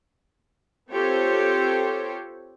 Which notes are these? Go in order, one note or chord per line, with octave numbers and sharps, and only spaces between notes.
C4 F4 G4 A4 C5 C#5